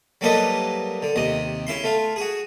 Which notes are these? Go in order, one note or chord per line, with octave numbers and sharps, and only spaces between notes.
F#3 G3 A#3 A4 B4 D#5
D3
D#2 C3 D#5
C#3 E4 C6
A3 F4
F#4 G#4